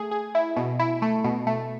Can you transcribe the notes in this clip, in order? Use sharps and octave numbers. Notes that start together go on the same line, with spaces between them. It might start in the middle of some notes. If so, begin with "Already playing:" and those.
Already playing: A3 G#4
G#4
E4
B2
E4
A3
B2
A3